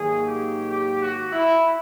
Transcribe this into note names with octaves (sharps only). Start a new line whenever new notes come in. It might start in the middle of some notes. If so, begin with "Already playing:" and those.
Already playing: G#2 D#3 F#3 A#3 G#4
G4
G4
F#4
E4